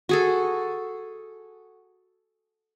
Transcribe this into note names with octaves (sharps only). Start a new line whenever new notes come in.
F#4 G#4 A4